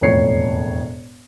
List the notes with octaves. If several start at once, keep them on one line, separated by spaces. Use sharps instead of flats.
E1 F2 A2 C#5 C7 C#7